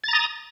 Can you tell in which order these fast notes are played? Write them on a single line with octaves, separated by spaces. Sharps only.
A6 A#5 D#6